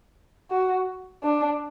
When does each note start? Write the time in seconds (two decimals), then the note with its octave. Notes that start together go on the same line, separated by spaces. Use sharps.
0.51 F#4
1.23 D4